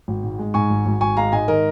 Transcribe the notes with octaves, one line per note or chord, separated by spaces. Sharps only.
G#1
G#2
G#3
G#2 G#5 C#6
G#1
G#1
G#1 G#5 C#6
G#3 F5 A#5
G#2 D#5 G#5
D#3 A#4 D#5